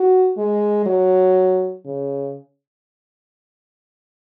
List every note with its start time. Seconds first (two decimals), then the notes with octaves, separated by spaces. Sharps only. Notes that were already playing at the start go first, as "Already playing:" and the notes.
Already playing: F#4
0.37 G#3
0.86 F#3
1.86 C#3